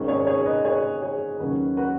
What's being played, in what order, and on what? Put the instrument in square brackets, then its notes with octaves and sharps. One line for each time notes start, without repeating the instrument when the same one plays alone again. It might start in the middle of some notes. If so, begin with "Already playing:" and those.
Already playing: [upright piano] G#1 G#2 D#3 G#3 C#4
G#4 C#5
G#4 C#5
B4 D#5
G#4 C#5
G#4 C#5
D#2 C#3 F#3 C#4 F#4 B4
F#4 B4